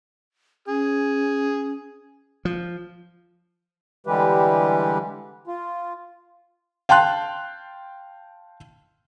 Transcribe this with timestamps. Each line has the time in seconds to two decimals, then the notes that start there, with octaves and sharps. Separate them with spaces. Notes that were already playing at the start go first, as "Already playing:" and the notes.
0.68 C#4 G#4
2.45 F3
4.07 D3 E3 G3 G#3 G4 B4
5.47 F4
6.89 F5 G5 A5 C6 F#6